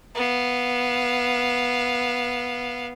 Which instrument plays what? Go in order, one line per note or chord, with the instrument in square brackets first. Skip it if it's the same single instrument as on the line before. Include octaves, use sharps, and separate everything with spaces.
[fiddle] B3 F5